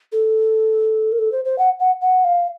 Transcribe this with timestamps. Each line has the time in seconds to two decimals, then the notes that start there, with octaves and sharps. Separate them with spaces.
0.12 A4
1.12 A#4
1.19 A4
1.32 C5
1.45 C5
1.58 F#5
1.80 F#5
2.02 F#5
2.24 F5